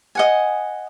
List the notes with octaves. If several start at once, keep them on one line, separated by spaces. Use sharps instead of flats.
D#5 F#5 G#5